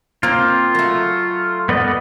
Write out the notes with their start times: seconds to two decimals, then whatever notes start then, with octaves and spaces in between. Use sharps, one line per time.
0.23 A#3 C4 F4
0.75 F#3 A3
1.69 B3 D5 D#5